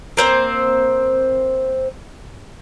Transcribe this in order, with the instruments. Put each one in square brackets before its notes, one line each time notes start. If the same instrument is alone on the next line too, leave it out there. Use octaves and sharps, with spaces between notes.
[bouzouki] A#3 C4 C5